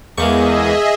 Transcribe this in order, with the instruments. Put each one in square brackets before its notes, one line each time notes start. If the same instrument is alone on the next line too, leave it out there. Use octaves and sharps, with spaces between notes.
[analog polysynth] E2 [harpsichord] G#3 A#3 C#6 [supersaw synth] G#4 D#5 E5